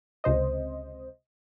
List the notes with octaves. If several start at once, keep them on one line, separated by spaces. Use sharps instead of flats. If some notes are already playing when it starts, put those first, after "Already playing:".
C#2 C3 C5 D#5